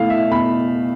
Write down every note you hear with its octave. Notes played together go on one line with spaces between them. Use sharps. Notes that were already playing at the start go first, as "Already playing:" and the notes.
Already playing: B2 A3 E4 F5
E5
B2 B5